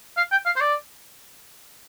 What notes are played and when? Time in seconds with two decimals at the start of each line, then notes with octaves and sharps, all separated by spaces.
0.17 F5
0.31 G5
0.46 F5
0.56 C5
0.60 D5